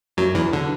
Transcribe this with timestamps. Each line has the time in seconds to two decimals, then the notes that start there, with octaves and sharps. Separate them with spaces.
0.17 F#2 F#3
0.34 E2 E3
0.53 D3